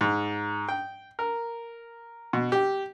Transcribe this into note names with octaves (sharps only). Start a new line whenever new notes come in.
G#2
G5
A#4
B2
G4